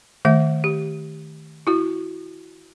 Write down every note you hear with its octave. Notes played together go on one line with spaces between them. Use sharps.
D#3 A3 E5
G4
E4 F#4